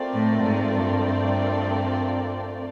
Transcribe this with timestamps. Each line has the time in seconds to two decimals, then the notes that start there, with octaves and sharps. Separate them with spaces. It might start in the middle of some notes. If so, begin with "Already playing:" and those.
Already playing: A3 C4 F4 A#4 D5
0.14 A2
0.44 G#2
0.74 G2
1.19 G2